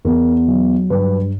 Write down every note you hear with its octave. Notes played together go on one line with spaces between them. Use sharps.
E2 A#4
F#3
G2 B4